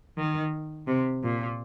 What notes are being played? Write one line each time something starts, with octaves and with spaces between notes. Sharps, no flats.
D#3
C3
A#2